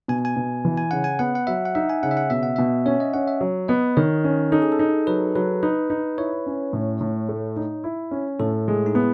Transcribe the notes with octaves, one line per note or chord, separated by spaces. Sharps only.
B2 G#5
G#5
B2
E3
G#5
C#3 F#5
G#5
B3 F#5
F#5
F#3 E5
F#5
D#4 E5
G#5
C#3 F#5
E5
F#5
B2 E5
F#5
B2 E5
C#4 C#5
D#5
C#4 F#5
E5
F#3
B3 D#5
D#3 C#5
C#4
D#4 A4
G#4
A4
D#4
F#3 B4
F#3 B4
D#4 B4
D#4
E4 C#5
C#4
A2
A2
A3
D#4
E4
C#4
A2 A4
G#3
D#4
B3 E4